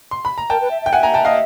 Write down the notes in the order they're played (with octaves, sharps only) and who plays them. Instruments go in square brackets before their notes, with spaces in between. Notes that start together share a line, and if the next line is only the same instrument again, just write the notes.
[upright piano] C6
B5
A#5
[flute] A#4 [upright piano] G5 A5
[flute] B4
E5
E5
[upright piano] G5
[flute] E5 [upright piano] F#5 G#5
[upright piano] G#5 A#5
G5 A5
D#5 F5